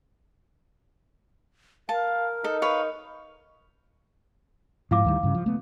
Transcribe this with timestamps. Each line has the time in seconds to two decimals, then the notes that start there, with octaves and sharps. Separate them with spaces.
1.89 A#4 F5 A5
2.44 D#4 A4
2.62 B4 C#5 F5
4.91 G#2 F3 E4 F5 D6
5.04 D2 D#3 G3
5.23 G2 C#3
5.34 F3
5.46 A3 B3